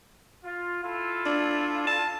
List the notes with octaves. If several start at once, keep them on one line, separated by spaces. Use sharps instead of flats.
F4
E4 F4 A4
D4
A5